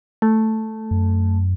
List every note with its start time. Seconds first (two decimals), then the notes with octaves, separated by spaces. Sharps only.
0.22 A3
0.91 F#2